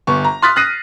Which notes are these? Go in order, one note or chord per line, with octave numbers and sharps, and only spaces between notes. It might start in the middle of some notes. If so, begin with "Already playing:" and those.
G1 B3 C#6
A#5
C6 D#6 F6 F#6 A6 B6
D#6 F#6 A#6 C7 D#7